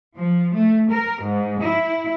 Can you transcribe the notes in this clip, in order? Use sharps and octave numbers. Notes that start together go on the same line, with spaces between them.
F3
A3
A#4
G#2
E4